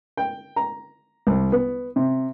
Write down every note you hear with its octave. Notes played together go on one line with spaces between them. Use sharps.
G5
A#5
C2
B3
C3